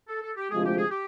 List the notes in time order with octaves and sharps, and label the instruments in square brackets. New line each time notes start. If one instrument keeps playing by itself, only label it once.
[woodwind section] A4
A4
G4
[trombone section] D2 C3 F3 G#3 [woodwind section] G#4
[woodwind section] G4
G#4
G4